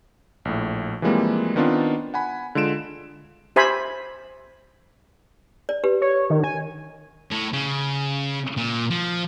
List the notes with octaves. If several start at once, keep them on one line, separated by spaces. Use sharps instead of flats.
A#1 A2
E3 F3 G3 G#3 A#3 C4
D#3 B3 C4 D4 F4
F#5 G#5 B5
D3 G#3 F4 D7 E7
G4 C5 E5 G#5 B5
D5
G4 B4
C#5
D#3
G#5
A2
C#3
A#2
F3